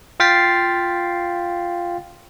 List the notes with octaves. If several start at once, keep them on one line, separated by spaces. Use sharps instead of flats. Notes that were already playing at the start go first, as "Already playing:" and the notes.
F4 F5 G5 A6 B6 C7